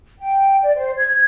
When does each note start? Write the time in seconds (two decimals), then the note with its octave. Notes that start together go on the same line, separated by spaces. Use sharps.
0.19 G5
0.62 D5
0.76 C5
0.97 G#6